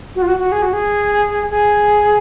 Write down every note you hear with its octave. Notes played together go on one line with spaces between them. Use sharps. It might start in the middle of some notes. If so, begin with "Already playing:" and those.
F#4
F4
F#4
F#4
G#4
F#4
G#4
G#4